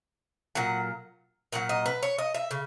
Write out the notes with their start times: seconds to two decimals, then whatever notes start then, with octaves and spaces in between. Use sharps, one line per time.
0.55 A#2 F#3 F#5
1.52 A#2 F#3 F#5
1.69 D#5
1.86 B4
2.03 C#5
2.19 D#5
2.35 E5
2.51 C#3